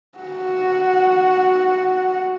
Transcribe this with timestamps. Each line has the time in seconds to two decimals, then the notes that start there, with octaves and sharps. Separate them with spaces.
0.19 F#4 F#5